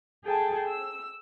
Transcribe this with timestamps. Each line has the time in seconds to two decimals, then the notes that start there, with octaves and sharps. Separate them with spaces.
0.24 G#4 A4 G5 A5
0.66 E6